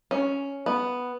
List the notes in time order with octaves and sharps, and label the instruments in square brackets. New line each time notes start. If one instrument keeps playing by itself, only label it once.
[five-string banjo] C#4
B3